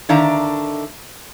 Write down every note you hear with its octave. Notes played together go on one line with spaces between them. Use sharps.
D3 D#3 D4 E5 F5 A#5